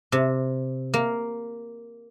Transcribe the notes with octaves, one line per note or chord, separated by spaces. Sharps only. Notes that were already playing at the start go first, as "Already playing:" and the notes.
C3
A#3